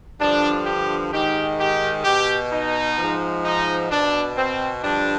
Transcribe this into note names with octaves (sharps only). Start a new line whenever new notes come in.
G2 D3 F3 D4
G4
G#2 D#3 G4
G4
B2 G4
D#4
G#2 F3
D#4
B2 D4
C4
G2 D3 F3 D4